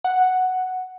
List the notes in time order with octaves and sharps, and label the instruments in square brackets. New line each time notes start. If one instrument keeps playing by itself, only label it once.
[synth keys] F#5